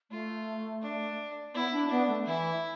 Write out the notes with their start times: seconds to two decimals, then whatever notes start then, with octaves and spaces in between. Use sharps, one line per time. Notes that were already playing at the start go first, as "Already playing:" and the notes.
0.10 A3 F4
0.82 D4
1.54 B3 E4
1.72 D4
1.90 B3 D4
2.08 A3
2.26 E3 E4